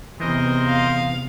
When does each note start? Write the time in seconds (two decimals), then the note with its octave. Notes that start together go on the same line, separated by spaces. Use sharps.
0.20 E2 C3 E3 A#4 C5 D#5
0.67 F5